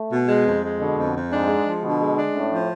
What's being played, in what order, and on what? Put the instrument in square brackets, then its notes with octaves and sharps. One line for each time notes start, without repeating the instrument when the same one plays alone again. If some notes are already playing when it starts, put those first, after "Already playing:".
Already playing: [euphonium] A3
[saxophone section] B2
G#3
F2
G#3
[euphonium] B2 [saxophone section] D3
[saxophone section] F2
F2
[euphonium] G#2 [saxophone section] D4
[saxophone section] G#3
F3
[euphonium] B2 [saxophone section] D3
[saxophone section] G#3
D4
[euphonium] A2 [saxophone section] C#4
[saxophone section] F3